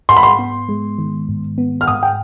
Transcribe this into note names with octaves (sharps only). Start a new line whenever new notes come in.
G#2 C6
B5
C6
B3
G#3
D#3
G#2
B3
F6
G#2 D#6
G5